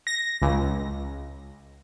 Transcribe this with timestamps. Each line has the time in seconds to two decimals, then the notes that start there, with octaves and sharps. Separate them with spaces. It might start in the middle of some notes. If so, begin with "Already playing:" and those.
0.07 A#6
0.42 C#2